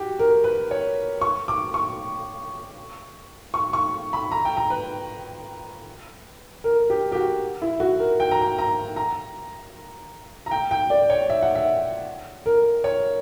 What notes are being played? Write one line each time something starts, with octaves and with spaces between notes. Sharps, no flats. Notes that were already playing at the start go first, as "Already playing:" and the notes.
Already playing: F#4 G4
A#4
B4
C#5
C#6
D6
C#6
C#6
C#6
B5
A#5
G5
A#5
B4
A#4
G4
G4
F#4
E4
F#4
A#4
G5
A#5
G5
A#5
A#5
A#5
G5
G5
D5
C#5
E5
F#5
E5
A#4
C#5